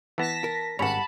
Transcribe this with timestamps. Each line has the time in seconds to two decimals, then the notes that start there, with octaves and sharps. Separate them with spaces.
0.18 E3 B3 A5 A#6 B6
0.44 A#4
0.79 G#1 G2 C#4 C#5 F#5 A5 B5